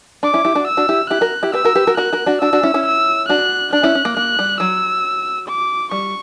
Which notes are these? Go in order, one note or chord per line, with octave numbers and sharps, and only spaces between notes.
D4 D6
C#4 E4
E4 G4
D4 F#4
E6
D4 F#4
E4 G4
E4 G4 F#6
F#4 A#4
E4 G4
G4 B4 E6
F#4 A#4
G4 B4
F#4 A#4
F#4 A#4 F#6
F#4 A#4
D4 F#4
D4 F#4 E6
D4 F#4
C#4 E4
C#4 E4
E6
D4 F#4 F#6
D4 F#6
C#4 E4
C#4
A#3
A#3 F#6
G3
F#3 E6
D6
G3 C#6